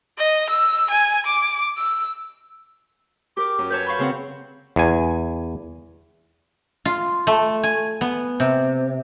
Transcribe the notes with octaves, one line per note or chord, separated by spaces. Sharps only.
D#5
E6
G#5
D6
E6
G4 A#4 D6
F#2
B4 C#5 A5 G6
F5 B5 C#6 G6
C#3 C4 F#5
E2 G#5
F4
A3
G#5
B3
C3